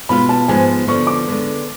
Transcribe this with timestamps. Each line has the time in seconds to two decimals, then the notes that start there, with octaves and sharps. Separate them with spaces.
0.09 B2 G#3 B3 F4 B5
0.29 A5
0.48 G#2 F3 G#3 B3 G#5
0.87 D3 F3 B3 C#6
1.07 D6
1.27 D3 G#3 B3